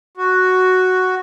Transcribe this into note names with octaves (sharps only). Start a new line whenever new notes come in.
F#4